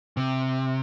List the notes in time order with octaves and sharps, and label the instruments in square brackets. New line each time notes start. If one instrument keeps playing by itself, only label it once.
[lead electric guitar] C3